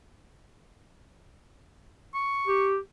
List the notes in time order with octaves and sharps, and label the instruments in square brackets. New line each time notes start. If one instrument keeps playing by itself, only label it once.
[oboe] C#6
[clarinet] G4